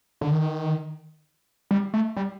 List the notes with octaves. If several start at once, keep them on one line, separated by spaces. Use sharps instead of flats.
D3
D#3
G3
A3
G3